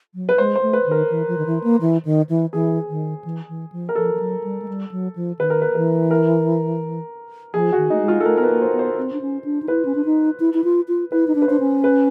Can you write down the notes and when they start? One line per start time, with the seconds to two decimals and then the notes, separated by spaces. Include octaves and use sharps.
0.15 F#3
0.29 B4
0.38 G#3 C5
0.55 C5
0.62 A3
0.73 B4
0.86 D#3
0.91 A#4
1.10 E3
1.28 F3
1.38 D#3
1.46 E3
1.63 A#3
1.81 E3
2.05 D#3
2.29 E3
2.53 E3 G#4
2.89 D#3
3.24 E3
3.49 E3
3.72 F3
3.89 A#4
3.95 F3 A4
4.14 F3
4.19 F#3
4.43 G3
4.62 G#3
4.68 G3
4.91 F#3
5.15 F3
5.39 D#3 B4
5.50 A#4
5.62 B4
5.75 E3 B4
6.11 A#4
7.54 F3 G#4
7.72 D#3 F#4
7.90 A3 D#4
8.01 G#3
8.08 F4
8.20 A4
8.25 A3 A#4
8.37 B3 A#4
8.43 B4
8.49 A#3
8.62 C5
8.73 B3
8.79 C5
8.97 C4
9.12 D4
9.21 C#4
9.44 D4
9.62 D#4
9.68 E4 B4
9.85 C#4
9.95 D4
10.05 D#4
10.40 E4
10.54 E4
10.64 F4
10.88 F4
11.12 E4 B4
11.27 D#4
11.35 D4
11.42 B4
11.48 D4 C5
11.60 C#4
11.84 B4